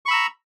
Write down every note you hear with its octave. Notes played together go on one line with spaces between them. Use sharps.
A#5 B5 C#6 E6